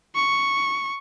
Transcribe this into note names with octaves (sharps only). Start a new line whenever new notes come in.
C#6